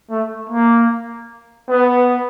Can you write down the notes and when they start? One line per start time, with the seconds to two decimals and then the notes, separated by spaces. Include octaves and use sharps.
0.10 A3
0.49 A#3
1.68 B3